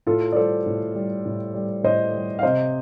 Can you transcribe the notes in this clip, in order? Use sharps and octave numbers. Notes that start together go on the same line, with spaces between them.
A2 F4 A4
D5
G3 A4 C5
A2
G3
A2
G3
A2 C5 D#5
G3
F5
C3 C5 D#5